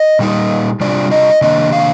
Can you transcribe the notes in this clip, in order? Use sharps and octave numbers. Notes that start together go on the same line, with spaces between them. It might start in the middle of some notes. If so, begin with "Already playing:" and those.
Already playing: D#5
A#2 G3 A#3 D#4
C3 G3 D4 F4 D5
D#5
C3 D#3 A#3 D4 D#5
F5